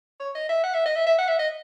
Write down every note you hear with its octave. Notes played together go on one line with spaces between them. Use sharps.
C#5
D#5
E5
F#5
E5
D#5
E5
E5
F#5
E5
D#5